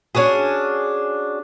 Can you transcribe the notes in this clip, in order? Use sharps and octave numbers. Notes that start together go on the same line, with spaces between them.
C#4 D4 F#4 G#4